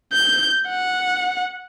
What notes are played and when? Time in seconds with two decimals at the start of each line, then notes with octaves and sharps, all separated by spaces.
0.12 G6
0.68 F#5